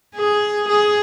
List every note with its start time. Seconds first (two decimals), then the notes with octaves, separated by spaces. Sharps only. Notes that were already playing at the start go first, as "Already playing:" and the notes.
0.15 G#4
0.68 G#4